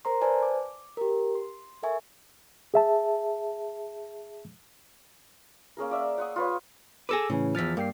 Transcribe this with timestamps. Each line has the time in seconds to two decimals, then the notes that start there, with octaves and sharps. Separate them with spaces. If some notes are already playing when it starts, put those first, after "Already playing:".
0.05 A#4 C5 A#5 C6
0.21 B4 C5 D5 G#5 A5
0.43 D6
0.97 G4 A#4
1.35 C6
1.83 A4 A#4 E5 G#5 C#6
2.74 G#4 E5 A5
5.77 A#3 C#4 G#4 A#4
5.91 D5 E5
6.18 F#5 C#6 D#6
6.36 F4 B4 C#5
7.09 G#4 A4 B4 D6 E6 A#6
7.30 A2 C#3 E3 C#4
7.55 E2 F3 F6 A6 B6
7.77 G2 A#3 G5 C7